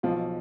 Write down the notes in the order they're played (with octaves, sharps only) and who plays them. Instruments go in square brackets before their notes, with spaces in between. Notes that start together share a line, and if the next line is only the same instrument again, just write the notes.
[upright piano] B1 B2 F3 F4